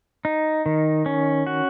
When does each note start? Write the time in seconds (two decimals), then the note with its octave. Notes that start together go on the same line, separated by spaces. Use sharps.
0.25 D#4
0.66 D#3
1.06 C#4
1.47 F#4